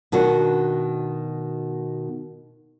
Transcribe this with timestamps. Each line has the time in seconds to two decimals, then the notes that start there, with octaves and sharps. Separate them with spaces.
0.12 B2 D#3 D4 F#4